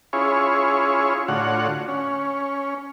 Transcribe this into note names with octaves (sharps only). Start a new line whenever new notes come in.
C#4 E4 F4 G#4 C#5
A2 D3 F4 F#4 C#5 F#5
C#4